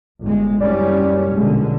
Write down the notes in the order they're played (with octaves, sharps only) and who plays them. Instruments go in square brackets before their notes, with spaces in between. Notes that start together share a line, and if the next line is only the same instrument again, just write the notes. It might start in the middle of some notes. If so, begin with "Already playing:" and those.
[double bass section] G1 G#3
[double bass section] F#1 G3 C#4 [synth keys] D5
[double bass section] A#1 B2 D3 [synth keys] G#3